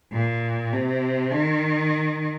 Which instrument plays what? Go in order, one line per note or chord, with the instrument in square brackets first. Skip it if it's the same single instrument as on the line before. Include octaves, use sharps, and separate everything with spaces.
[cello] A#2
C3
D#3